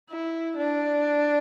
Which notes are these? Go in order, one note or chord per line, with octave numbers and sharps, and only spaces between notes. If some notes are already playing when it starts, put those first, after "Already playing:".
E4
D4